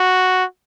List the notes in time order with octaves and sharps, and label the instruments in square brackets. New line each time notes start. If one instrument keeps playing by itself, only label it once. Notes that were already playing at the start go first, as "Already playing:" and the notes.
Already playing: [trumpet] F#4